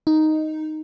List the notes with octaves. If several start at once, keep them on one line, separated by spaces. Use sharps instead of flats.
D#4